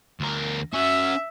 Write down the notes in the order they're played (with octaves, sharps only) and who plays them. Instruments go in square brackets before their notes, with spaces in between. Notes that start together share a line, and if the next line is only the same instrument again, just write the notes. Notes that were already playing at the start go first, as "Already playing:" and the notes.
[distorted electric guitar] D2 A#4
[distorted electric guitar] C#4 F#4 [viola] E5